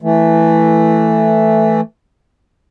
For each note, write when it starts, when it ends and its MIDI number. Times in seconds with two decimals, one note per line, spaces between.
0.02 1.81 52
0.02 1.81 57